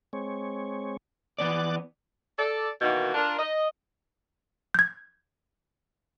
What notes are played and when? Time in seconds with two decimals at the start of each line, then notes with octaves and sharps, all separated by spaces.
0.13 G#3 C4 C#5
1.39 E3 B3 D5 D6 F#6 A6
2.38 A4 D5
2.81 B2 D#3 E3 A#3 D#4 F#4
3.14 D4 F4 A#4
3.38 D#5
4.74 G6 G#6